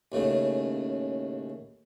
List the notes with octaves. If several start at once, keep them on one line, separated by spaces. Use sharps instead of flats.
D#2 A2 C#3